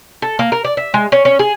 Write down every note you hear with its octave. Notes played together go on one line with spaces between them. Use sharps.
A4
A#3
A#4
D5
E5
G#3
C#4
C#4
G#4